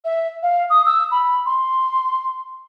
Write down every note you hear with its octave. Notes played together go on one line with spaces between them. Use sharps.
E5
F5
D#6
E6
B5
C6